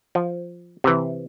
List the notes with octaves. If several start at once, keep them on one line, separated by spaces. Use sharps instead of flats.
F3
C3 E3